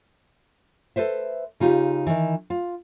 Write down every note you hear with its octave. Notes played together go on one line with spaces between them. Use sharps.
A4 B4 C5 E5
C#3 D#4 F4 G4
D#3 E3
F4